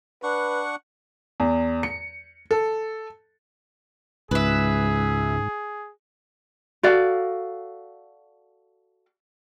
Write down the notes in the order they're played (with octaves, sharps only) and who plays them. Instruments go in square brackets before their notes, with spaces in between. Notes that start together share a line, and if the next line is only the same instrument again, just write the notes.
[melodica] D4 F#5 C#6 [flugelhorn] B4
[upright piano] E2
C#7
A4
[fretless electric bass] C#2 [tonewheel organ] G#2 [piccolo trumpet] G#4 [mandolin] B4 E5
[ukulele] F#4 A4 D5 F5